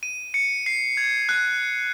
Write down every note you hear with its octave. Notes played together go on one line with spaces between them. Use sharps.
D#7
C#7
C7
G#6
F#6